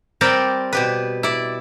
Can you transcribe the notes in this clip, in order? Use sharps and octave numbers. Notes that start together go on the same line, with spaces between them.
G3 C4 G4 A#4 D5 G5
B2 G4 B4
E4 D5